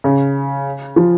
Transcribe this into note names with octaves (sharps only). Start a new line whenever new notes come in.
C#3
F3